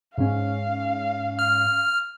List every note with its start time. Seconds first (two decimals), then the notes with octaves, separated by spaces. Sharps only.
0.18 G#2 C#4 F5
1.39 F6